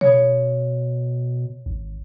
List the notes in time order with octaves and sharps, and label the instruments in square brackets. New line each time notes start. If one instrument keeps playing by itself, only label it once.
[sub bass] B2 [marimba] C#5
[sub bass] G#1